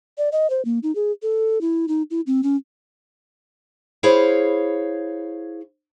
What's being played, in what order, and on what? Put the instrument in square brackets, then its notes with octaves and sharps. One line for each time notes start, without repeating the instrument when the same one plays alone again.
[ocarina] D5
D#5
C5
A#3
D#4
G#4
A4
E4
D#4
E4
C4
C#4
[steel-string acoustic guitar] E4 G#4 C5 C#5 F5